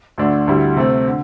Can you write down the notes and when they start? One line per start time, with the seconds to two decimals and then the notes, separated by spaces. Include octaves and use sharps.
0.18 D2 D3 A3 D4
0.48 D2 D3 G3 E4
0.77 C3 A3 C4
1.07 D3